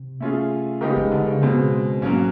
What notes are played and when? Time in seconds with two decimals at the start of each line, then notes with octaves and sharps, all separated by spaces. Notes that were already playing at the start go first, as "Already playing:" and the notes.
Already playing: C3
0.20 A3 C#4 F4 G#4
0.81 C#3 G#3 B3 D#4 G4 A#4
0.96 C#3
1.11 D3
1.26 C#3
1.41 B2 G#3 C4
2.02 G#2 F#3 A#3 C#4